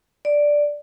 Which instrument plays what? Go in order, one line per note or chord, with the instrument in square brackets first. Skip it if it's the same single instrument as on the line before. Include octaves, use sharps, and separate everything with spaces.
[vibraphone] D5